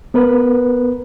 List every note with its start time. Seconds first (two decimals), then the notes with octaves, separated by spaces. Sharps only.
0.14 B3 A#4 B4